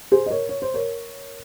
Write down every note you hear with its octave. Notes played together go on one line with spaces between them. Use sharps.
G#4 C5
D#5
A#4 C#5
C#5
C5
A#4 C#5